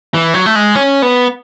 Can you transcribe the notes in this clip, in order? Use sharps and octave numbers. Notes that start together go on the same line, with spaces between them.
E3
F#3
A3
G#3
C#4
B3